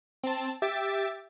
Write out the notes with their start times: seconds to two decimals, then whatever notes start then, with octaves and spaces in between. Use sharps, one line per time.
0.23 C4 A5
0.62 G4 E5 A6 D7